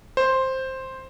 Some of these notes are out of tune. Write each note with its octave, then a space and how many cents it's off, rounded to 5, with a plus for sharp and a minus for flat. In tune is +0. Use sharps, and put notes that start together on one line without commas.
C5 +5